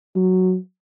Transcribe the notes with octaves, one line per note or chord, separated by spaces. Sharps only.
F#3